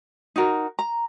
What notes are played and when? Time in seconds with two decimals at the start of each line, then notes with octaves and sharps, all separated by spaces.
0.36 D#4 F#4 A#4
0.79 A#5